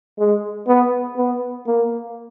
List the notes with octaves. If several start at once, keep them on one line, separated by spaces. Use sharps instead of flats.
G#3
B3
B3
A#3